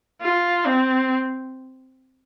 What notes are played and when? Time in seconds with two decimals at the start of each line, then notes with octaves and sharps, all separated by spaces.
0.21 F4
0.66 C4